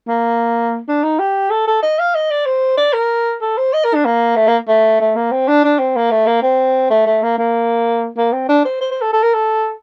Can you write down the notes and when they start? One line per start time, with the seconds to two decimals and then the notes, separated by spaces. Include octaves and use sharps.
0.08 A#3
0.88 D4
1.04 D#4
1.19 G4
1.50 A4
1.67 A4
1.83 D#5
1.99 F5
2.15 D#5
2.31 D5
2.46 C5
2.77 D5
2.93 A#4
3.42 A4
3.57 C5
3.73 D#5
3.84 A#4
3.95 D4
4.05 A#3
4.36 A3
4.48 A#3
4.68 A3
5.01 A3
5.16 A#3
5.32 C4
5.48 D4
5.64 D4
5.79 C4
5.96 A#3
6.11 A3
6.27 A#3
6.42 C4
6.90 A3
7.06 A3
7.23 A#3
7.38 A#3
8.17 A#3
8.33 C4
8.49 D4
8.65 C5
8.81 C5
8.91 C5
9.01 A4
9.13 A4
9.23 A#4
9.34 A4